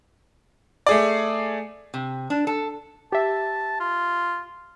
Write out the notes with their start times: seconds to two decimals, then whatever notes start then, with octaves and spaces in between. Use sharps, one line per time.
0.86 A3 G#4 D5
1.94 C3
2.30 D4
2.47 A4
3.12 G4 E5 A5
3.80 F4